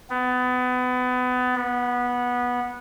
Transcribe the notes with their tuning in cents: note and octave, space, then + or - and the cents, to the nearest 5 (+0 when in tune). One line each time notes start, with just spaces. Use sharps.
B3 +25
B3 -15